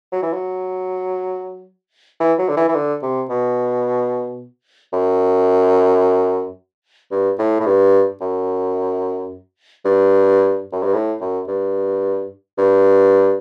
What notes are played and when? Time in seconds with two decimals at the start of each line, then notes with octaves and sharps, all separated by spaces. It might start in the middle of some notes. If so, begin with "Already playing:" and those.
0.12 F#3
0.23 E3
0.33 F#3
2.20 E3
2.39 F#3
2.49 D3
2.57 E3
2.68 E3
2.75 D3
3.02 C3
3.30 B2
4.93 F#2
7.11 G2
7.39 A2
7.60 A2
7.66 G2
8.21 F#2
9.85 G2
10.72 F#2
10.83 G2
10.94 A2
11.20 F#2
11.48 G2
12.58 G2